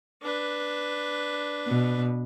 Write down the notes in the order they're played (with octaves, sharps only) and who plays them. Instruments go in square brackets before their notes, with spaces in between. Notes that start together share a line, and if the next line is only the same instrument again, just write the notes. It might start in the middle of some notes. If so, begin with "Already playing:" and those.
[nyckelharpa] D4 B4
[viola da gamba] B2